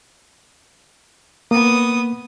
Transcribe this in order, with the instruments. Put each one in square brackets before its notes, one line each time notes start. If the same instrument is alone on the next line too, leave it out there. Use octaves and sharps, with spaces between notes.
[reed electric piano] A#3 [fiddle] B3 D#6